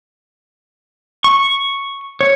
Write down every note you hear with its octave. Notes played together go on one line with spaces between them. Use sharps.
C#6
C#5